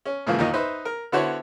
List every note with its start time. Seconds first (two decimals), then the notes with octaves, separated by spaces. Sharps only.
0.06 C#4
0.27 G#2 C#3 E3 F3 A#3
0.38 D#2 A#2 D#3 D#4 D#5
0.54 D#4 B4 C5 E5
0.85 A#4
1.12 D3 B3 E4 F#4 C5 C#5